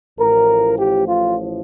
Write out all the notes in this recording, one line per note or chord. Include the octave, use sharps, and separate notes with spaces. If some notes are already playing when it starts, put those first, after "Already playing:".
A1 A2 F3 A#4
G4
F4